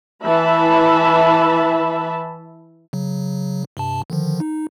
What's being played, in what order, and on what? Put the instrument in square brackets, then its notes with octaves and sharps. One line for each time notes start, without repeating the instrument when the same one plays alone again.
[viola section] E3 E5 A5 B5
[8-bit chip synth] C#3 F#3
G2 C3 A5
D3 D#3 F3
D#4